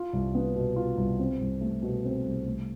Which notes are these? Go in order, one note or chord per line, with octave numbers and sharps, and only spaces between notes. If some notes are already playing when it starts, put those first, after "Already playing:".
Already playing: F4
C2
B3
B2
F4
C2
C4
C2
A3
B2
C4
C2
A3